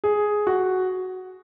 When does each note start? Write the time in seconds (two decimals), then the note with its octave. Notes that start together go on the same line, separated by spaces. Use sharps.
0.04 G#4
0.47 F#4